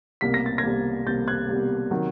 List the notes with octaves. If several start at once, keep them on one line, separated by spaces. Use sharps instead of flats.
C2 B2 G3 A#3 B6
A#6
A6
G#6 A#6
C2 B2 G3 A#3
C2 B2 G3 A#3 G6 A6
F#6 G#6
C2 B2 G3 A#3
C3 D#3 F#3